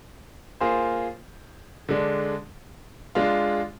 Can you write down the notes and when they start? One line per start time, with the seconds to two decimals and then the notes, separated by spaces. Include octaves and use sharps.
0.60 A#3 F4 G#4 C5
1.89 D3 G#3 D4
3.15 G#3 D4 F4